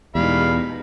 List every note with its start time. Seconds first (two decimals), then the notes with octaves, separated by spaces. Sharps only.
0.15 E2 B2 G3 G#3 D#4 F5 B5